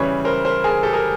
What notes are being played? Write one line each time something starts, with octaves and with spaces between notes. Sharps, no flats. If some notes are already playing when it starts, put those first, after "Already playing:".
Already playing: C#3 E3 G3 B4 C#5
A#4 C5
A#4 C5
G#4 A#4
G4 A4
G#4 A#4